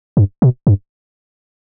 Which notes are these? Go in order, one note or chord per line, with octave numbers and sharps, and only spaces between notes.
G2
B2
G2